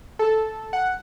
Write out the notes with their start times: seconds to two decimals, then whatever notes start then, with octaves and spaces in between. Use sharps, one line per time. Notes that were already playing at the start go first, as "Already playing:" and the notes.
0.19 A4
0.73 F#5